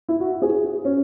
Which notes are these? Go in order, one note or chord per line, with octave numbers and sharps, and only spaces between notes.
E4
F#4
G#4
F#4
C#4